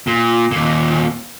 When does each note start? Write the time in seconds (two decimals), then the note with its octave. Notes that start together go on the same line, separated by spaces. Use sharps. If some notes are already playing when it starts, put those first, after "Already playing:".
0.07 A#2
0.52 D#2 A#2